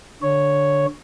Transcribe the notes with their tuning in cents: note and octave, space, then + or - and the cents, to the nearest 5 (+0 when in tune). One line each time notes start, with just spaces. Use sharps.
D3 +0 C#5 +0